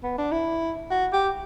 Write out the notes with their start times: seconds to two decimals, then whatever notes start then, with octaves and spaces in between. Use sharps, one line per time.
0.03 B3
0.18 D4
0.32 E4
0.90 F#4
1.13 G4